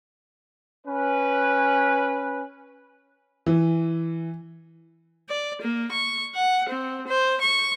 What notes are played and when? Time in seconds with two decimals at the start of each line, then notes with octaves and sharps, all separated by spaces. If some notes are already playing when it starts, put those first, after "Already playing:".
0.87 C#4 B4
3.46 E3
5.29 D5
5.62 A#3
5.91 C#6
6.35 F#5
6.69 C4
7.08 C5
7.42 C#6